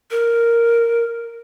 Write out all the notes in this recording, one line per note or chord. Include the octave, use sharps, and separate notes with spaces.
A#4